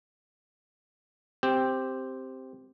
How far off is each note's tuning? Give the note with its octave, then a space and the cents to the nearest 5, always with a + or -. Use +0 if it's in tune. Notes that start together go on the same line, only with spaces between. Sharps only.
C4 +0 G4 +0